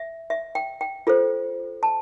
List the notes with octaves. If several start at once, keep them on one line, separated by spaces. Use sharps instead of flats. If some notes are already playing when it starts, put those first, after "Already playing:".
Already playing: E5
E5
G5
G5
F4 A4 C5
A5